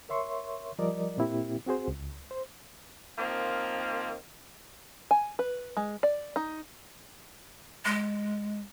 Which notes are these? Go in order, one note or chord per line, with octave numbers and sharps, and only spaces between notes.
A#4 C#5 E5 C6 C#6
F3 G3 A#4 D5 D#5
A#2 A#3 C4 E4 G4
C4 F#4 G#4 C5
C#2
C5
D#3 F3 A#3 C4
G#5
B4
G#3
D5
D#4
G#3